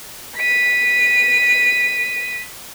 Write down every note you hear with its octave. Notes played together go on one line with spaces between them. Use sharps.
B6 D#7